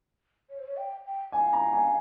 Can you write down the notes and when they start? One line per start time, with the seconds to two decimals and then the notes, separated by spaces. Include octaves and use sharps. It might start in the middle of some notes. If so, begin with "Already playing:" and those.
0.49 C#5
0.59 C5
0.67 C#5
0.77 G5
1.05 G5
1.32 F5 G#5
1.53 A#5
1.73 G#5